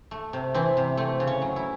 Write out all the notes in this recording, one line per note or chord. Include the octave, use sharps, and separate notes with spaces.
A3
C3
E3 C4
C3
A3 C4
C#3
C#4
F#3
E4